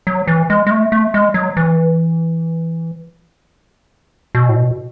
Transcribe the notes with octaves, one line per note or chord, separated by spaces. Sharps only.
F#3
E3
G#3
G#3
A3
A3
G#3
F#3
E3
B2
A2
B2